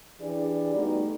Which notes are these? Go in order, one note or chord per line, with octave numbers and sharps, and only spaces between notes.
E3 D4 G4 G#4 D5
G3 A3 B3 D#4 F#4